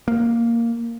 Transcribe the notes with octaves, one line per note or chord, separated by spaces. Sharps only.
A#3